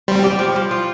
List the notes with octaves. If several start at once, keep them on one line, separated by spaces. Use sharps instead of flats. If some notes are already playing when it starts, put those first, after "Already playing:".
G3 C4
G4
F3
F3
F4